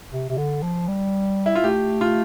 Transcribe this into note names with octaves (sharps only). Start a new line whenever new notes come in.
C3
C3
D3
F3
G3
E4
F4
A3 G4
F4